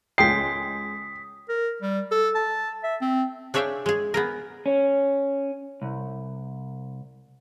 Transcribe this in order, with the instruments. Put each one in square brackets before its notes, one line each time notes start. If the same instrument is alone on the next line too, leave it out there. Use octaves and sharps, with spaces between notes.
[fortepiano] C#2 G#3 G5 [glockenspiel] D#6 B6 [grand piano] C7
[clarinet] A#4
G3
A4
A5
E5
C4
[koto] D4 G#4 C#5 E5 F5 G5
G#3 G#4
B3 G#4 A#4
[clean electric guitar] C#4
C2